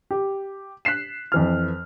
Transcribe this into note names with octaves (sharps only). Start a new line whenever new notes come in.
G4
F#6 B6 C7 E7
F2 E3 F6